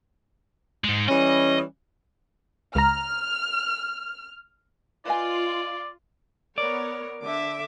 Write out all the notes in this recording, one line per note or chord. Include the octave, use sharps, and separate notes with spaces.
G#2 G#3
E3 G3 C#4 D#5
C#2 A#5 F6
F4 B4 D5 D#5 G#5
B3 A#4 C#5 D5
D3 E5 D6